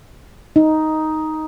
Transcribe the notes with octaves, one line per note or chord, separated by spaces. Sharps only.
D#4